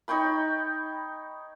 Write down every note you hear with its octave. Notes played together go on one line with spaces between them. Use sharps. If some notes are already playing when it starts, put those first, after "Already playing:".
D#4 C#5 G5 B5